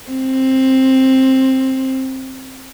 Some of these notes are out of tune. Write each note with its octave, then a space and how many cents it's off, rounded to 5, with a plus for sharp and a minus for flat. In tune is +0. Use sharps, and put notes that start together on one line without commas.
C4 +10